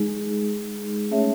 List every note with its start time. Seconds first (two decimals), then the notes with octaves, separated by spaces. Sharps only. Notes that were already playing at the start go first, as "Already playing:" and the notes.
Already playing: G#3 D#4 G#4
1.11 A3 C#4 G#4 C#5 E5